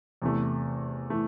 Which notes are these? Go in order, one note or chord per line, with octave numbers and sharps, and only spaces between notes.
E2 C3 E3 A3
E3 A3